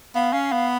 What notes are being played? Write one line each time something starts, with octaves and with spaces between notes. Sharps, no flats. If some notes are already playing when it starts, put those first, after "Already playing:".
B3 F5
C#4 F5
B3 F5